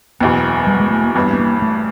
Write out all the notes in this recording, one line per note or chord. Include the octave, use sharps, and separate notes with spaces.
F#1 E2 B2 B3
G3
G#3
A3
A#3
A1 G2 E3 B3
B3
A#3
A3